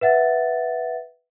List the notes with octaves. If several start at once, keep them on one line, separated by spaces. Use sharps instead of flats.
B4 E5 F#5 A6